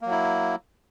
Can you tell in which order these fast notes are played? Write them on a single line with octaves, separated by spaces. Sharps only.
A#3 F#3 E4